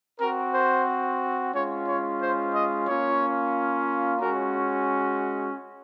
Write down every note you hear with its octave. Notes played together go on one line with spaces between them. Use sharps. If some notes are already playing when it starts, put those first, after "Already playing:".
C4 F#4 A#4
C5
G#3 C#4 F4 C#5
C#5
C5
D#5
A#3 C#4 F4 C#5
G#3 C#4 F#4 A#4